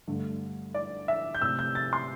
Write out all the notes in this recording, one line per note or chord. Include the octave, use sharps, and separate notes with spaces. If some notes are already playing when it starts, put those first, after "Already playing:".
G2 D3 A3
D5
E5
G6
C3 A3 E6
G6
A6
C6